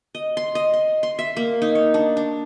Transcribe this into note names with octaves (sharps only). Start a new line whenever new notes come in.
D#5
C6
D#5
C6
C6
E5
A#3
D#4
C#5
D4
D4